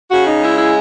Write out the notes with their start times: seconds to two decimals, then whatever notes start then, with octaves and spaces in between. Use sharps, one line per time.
0.10 C#3 F#4
0.26 D#4
0.41 G#3 E4
0.57 E4